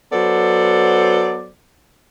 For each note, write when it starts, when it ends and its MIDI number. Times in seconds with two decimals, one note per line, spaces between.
0.12 1.49 54
0.12 1.49 59
0.12 1.49 69
0.12 1.49 72
0.12 1.49 74